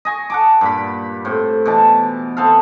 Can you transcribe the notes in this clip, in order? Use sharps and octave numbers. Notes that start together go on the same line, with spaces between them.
D#5 G#5 C#6
F#5 A5 D6
G2 A#2 B5
A2 C4
B2 E3 A5
B3 C4 A4 F5